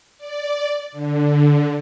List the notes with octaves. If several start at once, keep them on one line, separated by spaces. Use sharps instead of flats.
D5
D3